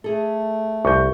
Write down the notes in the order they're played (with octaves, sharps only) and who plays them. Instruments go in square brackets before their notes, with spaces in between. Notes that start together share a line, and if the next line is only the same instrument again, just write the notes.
[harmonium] A3 [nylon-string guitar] G#4 A4
[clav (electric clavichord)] C2 [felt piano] C#6 G6